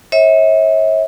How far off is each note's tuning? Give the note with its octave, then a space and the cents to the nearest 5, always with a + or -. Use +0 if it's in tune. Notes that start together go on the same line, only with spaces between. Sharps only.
C#5 -35 E5 -35